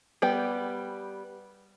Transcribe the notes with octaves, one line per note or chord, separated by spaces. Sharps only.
G3 B3 G4 G5